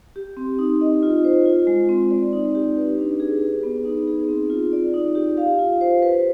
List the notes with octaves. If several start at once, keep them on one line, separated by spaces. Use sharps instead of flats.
G4
C4
D#4
D#5
F4
C5
F4
G#3
C4
D5
D#4
G4
B4
D4
G#4
B4
B3
D#4
G#4
C4
F4
D5
D#4
G4
F5
F4
C5
B4